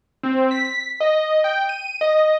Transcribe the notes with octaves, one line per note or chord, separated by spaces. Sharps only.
C4
B6
D#5
G5
D#7
D#5